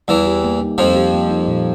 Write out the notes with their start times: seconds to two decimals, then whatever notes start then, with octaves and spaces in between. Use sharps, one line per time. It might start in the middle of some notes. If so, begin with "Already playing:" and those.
0.08 E2 E3 G3
0.26 G4
0.44 A#3
0.61 D#4
0.78 F2 F3 G3
0.96 G4
1.14 A#3
1.30 D#4
1.48 A#2